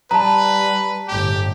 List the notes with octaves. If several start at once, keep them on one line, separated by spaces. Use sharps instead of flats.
G3 B4 A5 A#5
G1 A2 G4